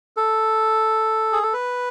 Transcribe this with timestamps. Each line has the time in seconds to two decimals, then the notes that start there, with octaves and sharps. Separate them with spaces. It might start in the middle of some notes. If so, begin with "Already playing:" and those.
0.17 A4
1.33 G#4
1.43 A4
1.53 B4